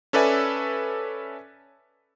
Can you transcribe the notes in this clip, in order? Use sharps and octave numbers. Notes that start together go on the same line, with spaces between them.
C#4 A4 B4 D5 E5 G#5